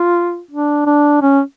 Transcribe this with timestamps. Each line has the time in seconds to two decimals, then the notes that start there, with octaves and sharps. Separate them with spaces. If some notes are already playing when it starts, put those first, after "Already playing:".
Already playing: F4
0.51 D4
0.86 D4
1.22 C#4